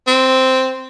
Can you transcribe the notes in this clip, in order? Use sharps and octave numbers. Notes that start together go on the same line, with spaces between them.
C4